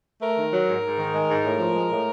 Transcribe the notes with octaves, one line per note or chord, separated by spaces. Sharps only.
A3 A#4
D#3
F#3
G#2
G#2
D#3
G#3
G#2
A2
F3
G#3
A2